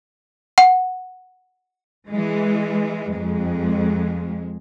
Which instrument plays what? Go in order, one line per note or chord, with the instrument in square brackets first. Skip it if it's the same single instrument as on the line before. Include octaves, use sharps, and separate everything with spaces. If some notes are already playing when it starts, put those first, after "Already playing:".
[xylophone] F#5
[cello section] E3 G#3
F2 G#3